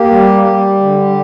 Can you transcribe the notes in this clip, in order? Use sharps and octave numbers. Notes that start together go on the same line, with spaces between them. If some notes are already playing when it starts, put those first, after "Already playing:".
Already playing: A#3 G4
G3
G3
D3